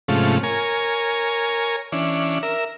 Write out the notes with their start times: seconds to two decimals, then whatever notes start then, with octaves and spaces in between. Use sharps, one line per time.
0.08 G#2 C3 F3 A3 C#4
0.43 A#4 C#5 G#5
1.92 E3 C#4 D4
2.43 A#4 E5